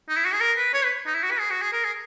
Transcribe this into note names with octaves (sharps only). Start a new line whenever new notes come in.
D#4
E4
F#4
G#4
A#4
B4
C#5
B4
D#4
E4
F#4
B4
G#4
F#4
G#4
A#4
G#4